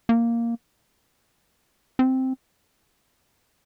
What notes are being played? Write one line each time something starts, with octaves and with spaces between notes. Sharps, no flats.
A#3
C4